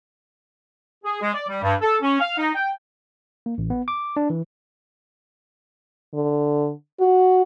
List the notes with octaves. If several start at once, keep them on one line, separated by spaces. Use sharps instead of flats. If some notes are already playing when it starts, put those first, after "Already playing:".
G#4
G#3
D5
G3
G2
A4
C#4
F5
D#4
G5
A#3
A1
B3
D6
D4
E3
D3
F#4